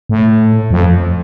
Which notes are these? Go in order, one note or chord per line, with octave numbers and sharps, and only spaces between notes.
A2
F2